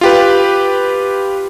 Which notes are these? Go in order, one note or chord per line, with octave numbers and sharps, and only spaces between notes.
F4 G4 B4